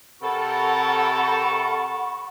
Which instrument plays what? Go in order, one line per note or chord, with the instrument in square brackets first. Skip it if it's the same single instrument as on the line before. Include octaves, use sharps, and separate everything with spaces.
[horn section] C3 A4 A#4 [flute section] F#5 B5 C#6